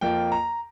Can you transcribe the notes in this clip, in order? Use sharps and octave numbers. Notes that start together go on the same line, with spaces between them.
F2 F3 A#3 G5
A#5